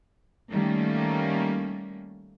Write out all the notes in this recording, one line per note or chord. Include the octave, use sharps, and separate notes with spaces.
D#3 G3 A3 A#3 C#4